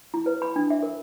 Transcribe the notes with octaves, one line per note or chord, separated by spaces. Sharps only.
E4
B4
B5
D4
E5
A#4